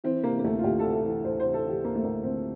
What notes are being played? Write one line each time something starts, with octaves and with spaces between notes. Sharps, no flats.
E3 C4
C3 A#3
A#3
D2 A3
F4
D2 G4
C3 A4
A4
E3
D2 C5
C3 C5
A4
E3 G4
D2 A#3
A3
D2 A#3
D2 C4